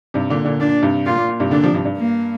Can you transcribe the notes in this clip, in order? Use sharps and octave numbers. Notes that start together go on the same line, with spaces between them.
G2 C3
A#2 D3
A#2 D3
A#2 D4
G2 C3
A#2 F4
A#2
A#2
G2 C3
A#2 D3 D4
C3 F3
G2 C3
G2
A#3